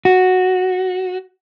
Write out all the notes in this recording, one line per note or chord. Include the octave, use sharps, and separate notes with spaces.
F#4